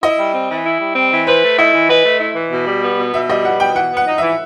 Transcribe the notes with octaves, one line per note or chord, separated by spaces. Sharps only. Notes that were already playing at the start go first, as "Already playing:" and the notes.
E4 D#5
G3
C4
E3
E4
G3
C4
E3
B4 C5
A3
E4 D#5
E3
B4 D#5
A3
E4
E3
B2
G3
B3
B2
B2 E5
G3 D#5
B3 F#5
B2 G5
E3 F#5
B3 F#5
D#4
E3 E5